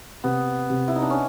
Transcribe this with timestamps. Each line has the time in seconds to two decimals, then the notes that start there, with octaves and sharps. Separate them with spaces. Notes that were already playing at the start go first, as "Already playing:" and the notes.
0.24 C3 B3
0.70 C3
0.88 E4
0.96 D#4
1.02 D4
1.10 C#4